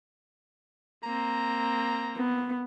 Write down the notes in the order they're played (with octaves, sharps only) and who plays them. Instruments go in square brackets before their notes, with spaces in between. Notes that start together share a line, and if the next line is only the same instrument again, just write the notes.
[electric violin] A#3 C4 [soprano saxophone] A#5
[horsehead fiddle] B3